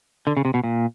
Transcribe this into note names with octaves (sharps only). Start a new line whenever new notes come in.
D3
C#3
C3
B2
A#2